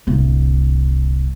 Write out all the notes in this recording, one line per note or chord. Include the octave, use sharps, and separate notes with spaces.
D1 C2